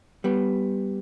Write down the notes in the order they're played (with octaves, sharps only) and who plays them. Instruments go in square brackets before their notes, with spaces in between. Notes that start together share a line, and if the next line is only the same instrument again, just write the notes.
[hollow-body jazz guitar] G3 B3